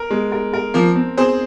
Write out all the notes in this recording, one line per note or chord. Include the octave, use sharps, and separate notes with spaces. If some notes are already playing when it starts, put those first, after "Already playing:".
Already playing: A#4
G#3
A#4
A#4
F3 A#3 C4
C4
C4 G#4 C5